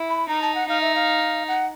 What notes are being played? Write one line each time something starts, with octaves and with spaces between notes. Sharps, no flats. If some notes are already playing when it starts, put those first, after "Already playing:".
Already playing: E4
B5
D#4 A#5
A5
F#5
D#4 F5
E5
F5
F#5